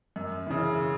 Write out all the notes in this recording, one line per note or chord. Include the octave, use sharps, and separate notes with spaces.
F#2
C#3 E3